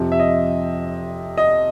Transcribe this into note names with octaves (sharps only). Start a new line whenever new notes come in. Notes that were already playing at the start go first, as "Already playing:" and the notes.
Already playing: F2 C3 F3
E5
D#5
D#5